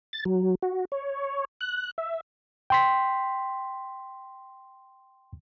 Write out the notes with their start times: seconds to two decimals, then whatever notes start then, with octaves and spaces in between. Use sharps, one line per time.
0.13 A6
0.25 F#3
0.63 F#4
0.92 C#5
1.61 F#6
1.98 E5
2.70 G5 C6 B6